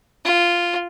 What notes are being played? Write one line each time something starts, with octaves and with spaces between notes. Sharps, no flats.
F4